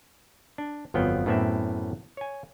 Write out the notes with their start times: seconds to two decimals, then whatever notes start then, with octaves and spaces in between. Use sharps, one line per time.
0.58 D4
0.94 G1 F2 F3 F#3 B3 G5
1.26 F#2 A2 B3 C4 D5 E5
2.17 C#5 G#5